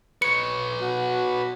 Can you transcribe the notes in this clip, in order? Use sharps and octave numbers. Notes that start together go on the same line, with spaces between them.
B4 C#5 C#7
B2 F#4